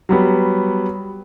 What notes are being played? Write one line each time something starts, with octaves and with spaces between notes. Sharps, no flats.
F#3 G3 B3